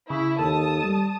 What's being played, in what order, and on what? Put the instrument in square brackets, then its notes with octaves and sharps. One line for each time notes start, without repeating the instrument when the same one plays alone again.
[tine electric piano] C#3 [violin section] E4
[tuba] D#2 [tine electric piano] A4 [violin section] A5 D#6
[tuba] G3